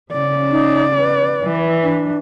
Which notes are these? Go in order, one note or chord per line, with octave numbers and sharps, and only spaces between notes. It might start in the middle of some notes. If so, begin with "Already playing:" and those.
C#3 D5
D#4
B4
E3
D4